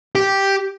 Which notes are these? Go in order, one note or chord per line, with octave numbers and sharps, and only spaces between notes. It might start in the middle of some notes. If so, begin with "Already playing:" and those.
G4